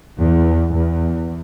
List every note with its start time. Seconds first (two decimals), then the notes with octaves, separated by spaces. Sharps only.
0.19 E2
0.75 E2